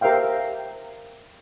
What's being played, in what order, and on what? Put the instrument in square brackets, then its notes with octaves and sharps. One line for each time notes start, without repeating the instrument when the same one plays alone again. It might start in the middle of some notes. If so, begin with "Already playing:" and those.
[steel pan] G4 A#4 C5 E5 F5 G5